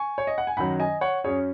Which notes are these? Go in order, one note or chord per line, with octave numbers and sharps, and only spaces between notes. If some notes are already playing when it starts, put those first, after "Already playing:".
Already playing: G#5 C#6
C#5
D#5
F#5
G#5
F#2 D#3 F#3 F#5 B5
D#5 G#5
C#5 F#5
F#2 F#3 C#4 G#4 C#5